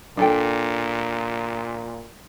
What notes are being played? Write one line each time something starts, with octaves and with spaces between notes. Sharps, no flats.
A#2 D4 A4 G5